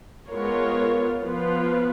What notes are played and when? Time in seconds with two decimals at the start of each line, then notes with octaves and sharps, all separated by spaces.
0.29 G#3 B3 F4 A#4 C#5
1.22 F3 B3 F4 B4